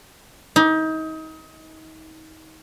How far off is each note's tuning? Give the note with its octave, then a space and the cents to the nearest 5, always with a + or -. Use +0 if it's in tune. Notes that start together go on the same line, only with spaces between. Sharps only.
D#4 +30